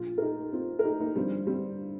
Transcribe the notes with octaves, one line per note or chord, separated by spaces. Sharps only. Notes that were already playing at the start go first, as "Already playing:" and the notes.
Already playing: A#1 A#2 F3 F4
A#4
D#4 G4
C4 F4
A#4
D#4 G4
A#3 D#4
G1 G2 F3 G3 C4
G3 C4